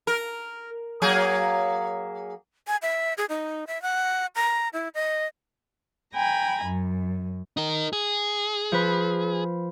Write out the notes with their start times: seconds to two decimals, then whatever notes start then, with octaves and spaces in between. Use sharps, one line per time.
0.07 A#4
1.02 F#3 A#3 G#4
2.67 G#5
2.82 E5
3.18 G#4
3.29 D#4
3.67 E5
3.82 F#5
4.36 A#5
4.73 E4
4.95 D#5
6.14 G5 G#5 A#5 B5
6.64 F#2
7.57 D#4 A#4
7.93 G#4
8.72 F3 B4